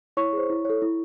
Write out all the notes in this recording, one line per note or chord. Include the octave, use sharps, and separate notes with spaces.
E4 C#5 C#6
G#4 C5
E4
A4 C#5
E4